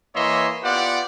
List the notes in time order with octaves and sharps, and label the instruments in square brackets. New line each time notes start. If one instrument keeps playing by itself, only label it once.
[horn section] E3 A#3 C#5 D#5 E5 C6
B3 F4 G4 D5 F#5